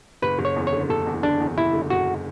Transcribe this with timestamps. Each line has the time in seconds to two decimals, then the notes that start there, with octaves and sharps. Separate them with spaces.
0.22 F#1 B4
0.39 F#1
0.45 C#5
0.56 E2
0.67 C#5
0.73 D3
0.90 F#1 A4
1.07 E2
1.23 D3 D4
1.40 E2
1.58 F#1 E4
1.73 D3
1.90 F#1 F#4